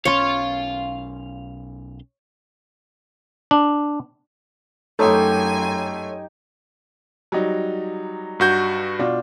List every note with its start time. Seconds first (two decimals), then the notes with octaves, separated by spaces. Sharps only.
0.05 B1 D#3 C#4 C#5 F5 C6
3.51 D4
4.99 F#2 A3 D#4 G4 A4 C#5 G#5 C6
7.32 F#3 G3 D#4
8.40 G2 F#4 G6
8.99 B2 D4 F4